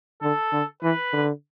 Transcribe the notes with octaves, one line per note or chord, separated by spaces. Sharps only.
D3 A4
D3
E3 B4
D3